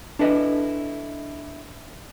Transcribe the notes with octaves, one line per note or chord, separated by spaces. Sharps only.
D4 E4 A4 B4 D#5